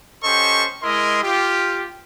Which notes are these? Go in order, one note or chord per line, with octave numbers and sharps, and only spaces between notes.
C#4 G4 A4 C5 D#5 C#6
G#3 E4 A#4 D#5 C6
F4 G4